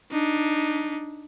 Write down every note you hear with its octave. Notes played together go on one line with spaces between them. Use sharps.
D4 D#4